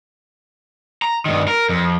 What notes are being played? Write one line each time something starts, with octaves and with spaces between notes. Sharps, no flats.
A#5
G2 D#3
A#4
F2